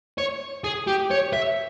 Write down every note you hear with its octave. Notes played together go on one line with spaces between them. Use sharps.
C#5
G#4
G4
C#5
E5